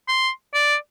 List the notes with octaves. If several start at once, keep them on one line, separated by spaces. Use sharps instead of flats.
C6
D5